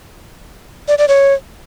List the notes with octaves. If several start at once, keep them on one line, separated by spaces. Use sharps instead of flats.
D5
D5
C#5